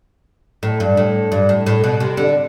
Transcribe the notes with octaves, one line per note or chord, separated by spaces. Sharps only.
A2
G2
A2
G2
A2
A2
B2
C3
D3